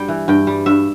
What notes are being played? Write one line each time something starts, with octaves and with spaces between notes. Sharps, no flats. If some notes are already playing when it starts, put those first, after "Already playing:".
Already playing: G2 G3 G5
E3
G2 G5
G3
G2 E5